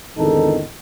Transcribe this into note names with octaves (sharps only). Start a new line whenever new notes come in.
G#1 E2 D3 D#3 D#4 A4